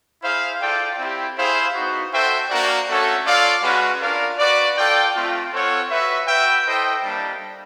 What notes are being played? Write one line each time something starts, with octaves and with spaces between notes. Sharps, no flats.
E4 G#4 C5 F5
F4 A4 D5 G5
C4 E4 G4
E4 G#4 C5 F5
B3 D#4 F#4
F#4 A4 C5 E5 G5
A#3 D4 F#4 A#4 D5
A3 C#4 F#4 A4 C#5
F4 A4 D5 F5
G#3 C#4 F#4 B4
D4 F4 A#4 D5 F5
F#4 B4 D5
F4 A4 D5 G5
A3 C4 F4
C4 F4 A4 C#5 F#5
F#4 B4 E5
F#4 B4 E5 G5
E4 A4 C5 D#5 G5
G3 A#3 D4